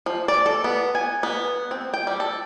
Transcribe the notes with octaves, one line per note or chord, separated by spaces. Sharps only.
F3
D5
A4
B3
G#5
B3
C4
G5
G3
A4